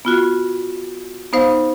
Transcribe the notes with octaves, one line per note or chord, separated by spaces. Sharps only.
B3 F4 F#4
B3 D#4 C5 F5